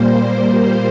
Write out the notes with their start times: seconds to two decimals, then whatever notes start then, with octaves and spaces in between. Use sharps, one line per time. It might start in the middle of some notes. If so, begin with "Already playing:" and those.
Already playing: A#2 G3 A#3 C5